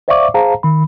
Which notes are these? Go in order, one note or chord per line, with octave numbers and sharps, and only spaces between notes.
C5 D5 E5 F5 C#6 D6
G#4 C5 F5 A5 A#5
D#3 B5